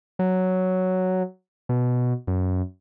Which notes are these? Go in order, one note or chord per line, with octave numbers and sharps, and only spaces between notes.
F#3
B2
F#2